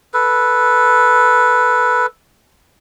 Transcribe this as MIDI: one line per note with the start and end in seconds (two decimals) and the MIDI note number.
0.14 2.06 69
0.14 2.06 71